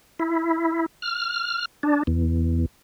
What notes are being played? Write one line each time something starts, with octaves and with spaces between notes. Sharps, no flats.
E4
F6
D4
E2